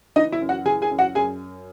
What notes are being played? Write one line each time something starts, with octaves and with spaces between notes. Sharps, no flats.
E3 D#4 D#5
E4 E5
F#2
F#4 F#5
E3 G#4 G#5
G#4 G#5
F#2
F#4 F#5
F#2 G#4 G#5